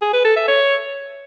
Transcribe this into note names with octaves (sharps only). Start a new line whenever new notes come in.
G#4
B4
A4
E5
C#5